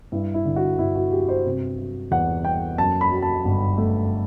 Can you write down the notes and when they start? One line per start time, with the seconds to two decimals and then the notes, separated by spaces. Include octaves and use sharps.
0.12 G2 E4
0.34 E4
0.45 D3
0.56 F#4
0.78 G1 E4
0.96 F#4
1.11 F#3 G4
1.29 C5
1.46 C3
1.78 F#3
2.11 E2 F#5
2.45 B3 G5
2.78 F#2 A5
3.01 B5
3.11 F#3
3.22 A5
3.45 G1
3.78 A3